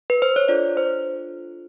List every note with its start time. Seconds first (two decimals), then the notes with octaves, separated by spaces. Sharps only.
0.10 B4
0.22 C5
0.36 C#5
0.48 D4 F4 A4 D5
0.77 C5